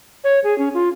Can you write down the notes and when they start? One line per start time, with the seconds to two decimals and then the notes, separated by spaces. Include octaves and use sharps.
0.24 C#5
0.44 G#4
0.58 C#4
0.74 F4